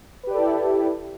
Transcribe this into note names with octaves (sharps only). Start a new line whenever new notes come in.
E4 G4 A4 B4 D5